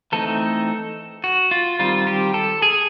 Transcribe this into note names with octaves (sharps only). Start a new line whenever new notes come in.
E3 A3 C4 D#4 A4
F#4
F4
D#3 G3 C4 F4
G4
A4
G#4